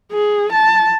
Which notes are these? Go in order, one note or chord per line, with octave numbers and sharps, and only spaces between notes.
G#4
A5